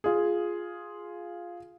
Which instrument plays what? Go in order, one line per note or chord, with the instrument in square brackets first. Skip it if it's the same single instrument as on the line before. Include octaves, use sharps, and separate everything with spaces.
[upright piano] F4 G#4